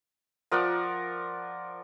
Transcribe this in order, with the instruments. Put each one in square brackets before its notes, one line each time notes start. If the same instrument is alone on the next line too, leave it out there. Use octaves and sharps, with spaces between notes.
[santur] F3 A#4 D5 F#5